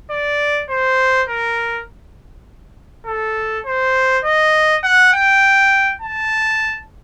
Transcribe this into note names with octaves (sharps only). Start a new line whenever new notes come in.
D5
C5
A#4
A4
C5
D#5
F#5
G5
A5